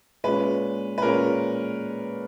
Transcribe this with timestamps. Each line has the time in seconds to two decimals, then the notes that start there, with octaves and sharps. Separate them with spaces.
0.24 A#2 G#3 C#4 B4
0.98 B4
1.02 A#2 G#3 C#4 A#4